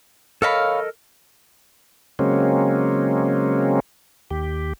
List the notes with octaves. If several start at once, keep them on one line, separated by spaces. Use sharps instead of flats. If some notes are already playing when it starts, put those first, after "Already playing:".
A4 A#4 C#5 D#5 F5 B5
C#3 F#3 G#3 A#3 C4 C#4
D#2 G4